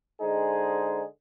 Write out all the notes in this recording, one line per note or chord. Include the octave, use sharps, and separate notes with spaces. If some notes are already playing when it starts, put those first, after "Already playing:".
D3 G#3 D#4 G#4 C5